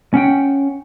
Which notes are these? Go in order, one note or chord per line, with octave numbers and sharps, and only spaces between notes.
C#4 F#5 G5